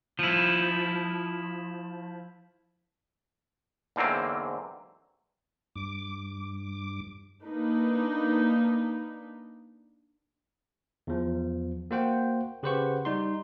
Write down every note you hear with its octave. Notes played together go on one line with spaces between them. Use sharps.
F3 E4
E2 G#2 D3 F#3 A#3 C4
G2 D6
A#3 D4 D#4 B4
E2 F3
A#3 F#4 C5 F#5 G5
C#3 G4 B4 C5 F#5 C#6
G3 D#4 C6